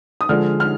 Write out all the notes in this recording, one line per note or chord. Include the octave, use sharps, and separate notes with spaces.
D#6
D3 F3 G#3 F6
F6